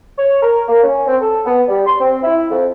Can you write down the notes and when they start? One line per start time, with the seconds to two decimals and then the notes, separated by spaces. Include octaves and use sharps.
0.18 C#5
0.42 A#4
0.67 A#3
0.84 C#4
1.07 C4
1.22 A4
1.46 B3
1.68 G3
1.87 C6
2.01 C4
2.23 E4
2.51 F2